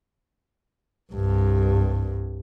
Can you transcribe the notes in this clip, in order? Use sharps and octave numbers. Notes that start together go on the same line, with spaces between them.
C2 G2